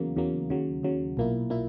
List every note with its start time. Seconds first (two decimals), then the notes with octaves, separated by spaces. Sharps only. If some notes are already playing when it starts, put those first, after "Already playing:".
Already playing: E2 C#3 F#3 A#3
0.16 E2 C#3 F#3 A#3
0.50 D#2 C#3 F#3
0.83 D#2 C#3 F#3
1.17 B1 A#2 A#3 E4
1.50 A#2 A#3 E4